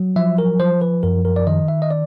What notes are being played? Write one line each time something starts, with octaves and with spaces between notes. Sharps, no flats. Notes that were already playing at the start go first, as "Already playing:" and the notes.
Already playing: F#3
F3 E5
A#4
F3 C5
B4
F#2 A#4
A#4
D5
D#3 D#5
E5
D#5
D5